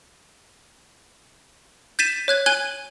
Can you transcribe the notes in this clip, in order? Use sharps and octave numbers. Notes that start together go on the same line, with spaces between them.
G6 A6 B6 D#7 E7
C#5 F#6 G#6
G#5 F#6 G#6 D#7 F#7 G7